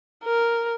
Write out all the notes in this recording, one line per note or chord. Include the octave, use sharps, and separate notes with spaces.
A#4